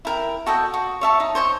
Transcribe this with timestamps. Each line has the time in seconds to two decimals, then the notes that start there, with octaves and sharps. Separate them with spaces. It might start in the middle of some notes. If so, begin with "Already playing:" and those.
0.05 E4 A#4 G5
0.46 F#4 A4 D#5 G5
0.74 F#4
1.01 C#5 E5 A5 C#6
1.20 D#4
1.35 C5 C#5 D#5 G#5